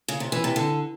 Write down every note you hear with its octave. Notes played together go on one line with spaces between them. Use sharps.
C#3
C3
E3
C3
D3